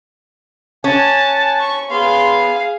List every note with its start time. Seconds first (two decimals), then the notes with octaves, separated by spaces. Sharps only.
0.84 C#4 F#5 G#5 A5
1.60 C#6
1.90 B3 G#4 F5 C6